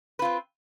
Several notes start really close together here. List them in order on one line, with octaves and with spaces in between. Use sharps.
B4 F4 C4